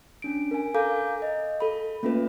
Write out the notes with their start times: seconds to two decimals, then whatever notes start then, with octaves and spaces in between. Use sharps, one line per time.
0.22 C#4 D4 D7
0.51 A#4 G#5
0.74 A4 F5 G#5 A#5 D6 G6
1.22 D#5
1.60 A4 B5
2.03 A3 A#3 C#4 F4 B4